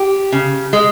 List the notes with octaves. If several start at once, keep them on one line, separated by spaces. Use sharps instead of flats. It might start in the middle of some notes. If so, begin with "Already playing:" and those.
Already playing: G4
C#3
G#3